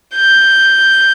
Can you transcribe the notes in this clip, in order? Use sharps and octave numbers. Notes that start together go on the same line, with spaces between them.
G6